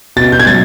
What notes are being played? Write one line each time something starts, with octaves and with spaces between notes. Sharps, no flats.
B2 A6
G6
G#6
F#3 A6